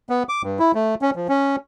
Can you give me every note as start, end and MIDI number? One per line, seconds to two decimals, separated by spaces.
0.09 0.23 59
0.29 0.42 86
0.43 0.59 43
0.59 0.72 64
0.75 0.95 57
1.02 1.11 61
1.16 1.27 53
1.28 1.56 61